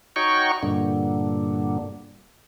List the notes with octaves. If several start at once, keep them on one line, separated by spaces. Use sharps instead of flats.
D#4 F#4 C#5 G5 C#6
G2 A#2 D3